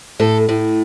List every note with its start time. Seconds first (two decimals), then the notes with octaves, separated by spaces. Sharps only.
0.19 A2 A4
0.49 A2